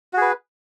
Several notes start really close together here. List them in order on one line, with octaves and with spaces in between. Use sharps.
F#4 G#4 B4